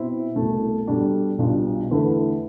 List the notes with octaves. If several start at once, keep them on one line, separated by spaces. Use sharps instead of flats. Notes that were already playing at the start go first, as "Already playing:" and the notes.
Already playing: B2 C4 E4
C2 B2 A3
B2 G3 D4 A4
B1 B2 G3 D4 F4
E2 D3 A3 E4 B4